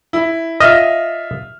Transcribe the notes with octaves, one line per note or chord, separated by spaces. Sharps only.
E4
F4 D#5 E5 F6